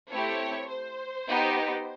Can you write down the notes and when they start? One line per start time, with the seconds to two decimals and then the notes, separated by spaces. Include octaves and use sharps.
0.10 A3 C4 E4 G4 C#5
0.69 C5
1.28 B3 D#4 G4